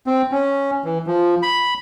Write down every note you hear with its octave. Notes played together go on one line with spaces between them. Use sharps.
C4
C#4
E3
F3
B5